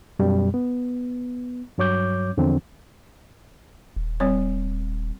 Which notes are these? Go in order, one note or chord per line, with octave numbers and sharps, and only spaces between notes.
F#2 B2 G3
B3
G2 F#3 C#5 D6 G6
E2 D3 F3 C4
D#1
G3 C4 C#5